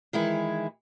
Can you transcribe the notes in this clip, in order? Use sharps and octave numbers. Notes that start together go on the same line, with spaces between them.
D#3 E3 G#3 E4